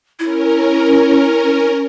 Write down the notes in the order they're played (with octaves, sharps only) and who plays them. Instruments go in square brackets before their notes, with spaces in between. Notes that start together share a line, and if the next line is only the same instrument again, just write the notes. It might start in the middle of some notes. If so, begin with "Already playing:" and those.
[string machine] C#4 A#4 [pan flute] E4